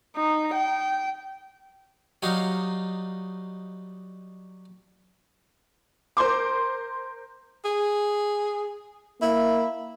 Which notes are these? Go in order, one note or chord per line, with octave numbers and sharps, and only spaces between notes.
D#4
G5
F#3 G3 D#4 C#5 F5
A#4 C5 C6 D6
G#4
A#3 E4